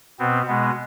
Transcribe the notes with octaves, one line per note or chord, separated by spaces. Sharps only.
B2 B3 C4
B2 G#3 B3